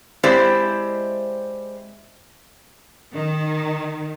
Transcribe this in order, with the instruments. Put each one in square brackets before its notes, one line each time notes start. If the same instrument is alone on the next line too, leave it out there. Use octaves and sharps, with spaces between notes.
[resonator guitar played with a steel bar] G#3 C4 E4 G4 C5 D5
[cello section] D#3